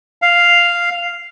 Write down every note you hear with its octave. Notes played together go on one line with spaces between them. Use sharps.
F5